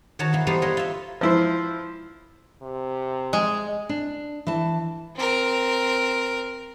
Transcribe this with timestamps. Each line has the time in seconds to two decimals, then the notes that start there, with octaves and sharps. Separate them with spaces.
0.19 D#3 F#4 C#5 A5 A#5
0.33 E3 A#3
0.47 G3 A3 B3 D#4 C5 F5
0.62 A#4 C#5 D#5 F#5 B5 C6
0.77 F4 E5
1.21 F3 E4 C5
2.62 C3
3.33 G#3
3.89 D4
4.47 E3 A5
5.16 C4 A#4